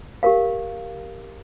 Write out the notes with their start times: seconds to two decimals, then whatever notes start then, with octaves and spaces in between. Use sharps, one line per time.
0.23 G4 A#4 F5